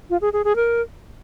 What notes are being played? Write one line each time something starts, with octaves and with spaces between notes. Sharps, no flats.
F4
G#4
G#4
G#4
A#4